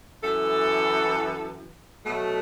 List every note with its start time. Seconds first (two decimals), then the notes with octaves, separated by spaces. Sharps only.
0.23 F#2 E3 A4
2.06 B2 F#3 A3